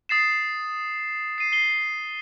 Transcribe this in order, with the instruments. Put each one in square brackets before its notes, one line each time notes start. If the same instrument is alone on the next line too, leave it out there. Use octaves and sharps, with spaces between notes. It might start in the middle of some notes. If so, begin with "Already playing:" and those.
[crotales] D#6 A6 C7 E7
C7 D#7
C7 G7